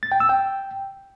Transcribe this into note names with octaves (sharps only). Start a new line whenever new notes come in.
A6
G5
E6
G5